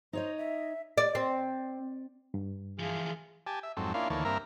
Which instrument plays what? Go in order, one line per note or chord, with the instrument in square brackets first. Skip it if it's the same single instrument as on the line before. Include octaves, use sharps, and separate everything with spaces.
[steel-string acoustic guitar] D#4 C#5 D#5 [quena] C5
[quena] E5
[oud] D5
C4
[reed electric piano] G2
[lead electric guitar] E3 F3 [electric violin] G#4 F5
[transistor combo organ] G4 G#5 A5
E5
F2 G#2 F#3 C4 A4
A#3 C#4 D4 E4 F4 F5
D2 D#3 E3 A#3 C#5 A5
G2 A#3 C4 A#4 E5 A#5